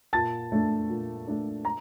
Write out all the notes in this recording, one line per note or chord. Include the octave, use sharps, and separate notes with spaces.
A#2 A5 A6
A3 D4
A#2
A3 D4
A#5